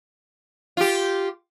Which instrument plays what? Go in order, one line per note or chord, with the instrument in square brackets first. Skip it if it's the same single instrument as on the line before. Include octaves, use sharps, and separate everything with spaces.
[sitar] F4 G4